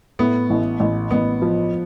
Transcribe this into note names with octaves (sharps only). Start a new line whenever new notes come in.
A2 B3
A1
A1
A1 B3
F3